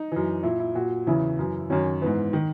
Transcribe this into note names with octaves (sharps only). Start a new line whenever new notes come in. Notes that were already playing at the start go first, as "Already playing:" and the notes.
Already playing: D#4
F#2 E3
A#2 E4
E4
A#2 F#4
E2 C#3 E3 E4
F#2 E3
F#2 D#3 C#4
G#2 E3 B3
D#3